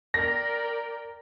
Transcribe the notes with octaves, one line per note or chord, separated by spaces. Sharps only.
A#4 D5 G5 A#6